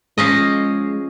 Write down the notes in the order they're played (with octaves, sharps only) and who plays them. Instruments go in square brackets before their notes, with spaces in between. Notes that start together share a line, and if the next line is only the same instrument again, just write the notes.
[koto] F3 C#4 D#5 [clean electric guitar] G#3